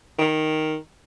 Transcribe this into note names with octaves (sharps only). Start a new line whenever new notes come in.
D#3